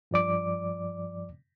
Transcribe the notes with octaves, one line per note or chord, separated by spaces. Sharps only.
G2 F3 D5 D6